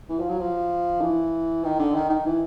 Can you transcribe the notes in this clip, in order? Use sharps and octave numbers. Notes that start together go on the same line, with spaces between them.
E3
F3
F#3
F3
E3
D#3
D3
D#3
D#3
E3